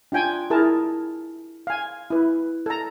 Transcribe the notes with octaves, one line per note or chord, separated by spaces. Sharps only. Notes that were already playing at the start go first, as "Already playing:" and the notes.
D4 F4 G5 G#5
E4 G#4 A#4 A5
F5 G#5
E4 B4
A4 A#5